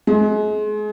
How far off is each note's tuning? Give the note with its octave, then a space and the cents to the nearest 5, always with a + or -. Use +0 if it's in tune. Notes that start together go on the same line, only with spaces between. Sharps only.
G#3 +30